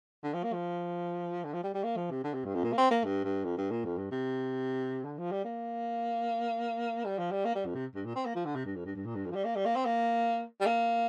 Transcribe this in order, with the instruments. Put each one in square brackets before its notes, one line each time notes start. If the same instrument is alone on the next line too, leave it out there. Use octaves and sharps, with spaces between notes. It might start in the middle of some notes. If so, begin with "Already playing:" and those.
[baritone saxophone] D3
F3
A#3
F3
D3
F3
G3
G3
A#3
F3
C3
D3
C3
G2
F2
A#2
A#3
C4
A#3
G2
G2
F2
G2
A#2
F2
G2
C3
D3
F3
G3
A#3
G3
F3
G3
A#3
G3
F2
C3
G2
A#2
C4
A#3
F3
D3
C3
G2
F2
G2
G2
A#2
G2
F2
F3
G3
A#3
G3
A#3
C4
A#3
G3
A#3